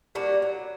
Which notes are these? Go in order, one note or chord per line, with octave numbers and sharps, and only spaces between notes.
G3 A#3 D4 F#4 A4
F#3